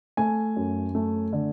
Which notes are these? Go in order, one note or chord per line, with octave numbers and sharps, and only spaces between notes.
A3 G#5
F#2
A3
D3